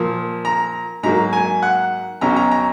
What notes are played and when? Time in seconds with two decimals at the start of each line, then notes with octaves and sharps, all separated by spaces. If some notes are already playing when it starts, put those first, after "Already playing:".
Already playing: A#2 F3 A#3
0.45 A#5
1.03 G#2 F#3 A#3 A#5
1.33 G#5
1.62 F#5
2.21 B1 B2 F#3 C#4 A#5
2.36 A#5
2.51 A#5